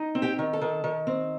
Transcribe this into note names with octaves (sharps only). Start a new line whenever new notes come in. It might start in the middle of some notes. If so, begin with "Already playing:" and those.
Already playing: D#4
C4
G4 G5
D#3
A4 A5
D#3
D#3
C4